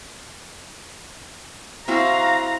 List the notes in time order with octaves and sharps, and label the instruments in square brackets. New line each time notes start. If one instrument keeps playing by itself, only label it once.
[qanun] C4 E4 F#4 [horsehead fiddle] F5 [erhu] A#5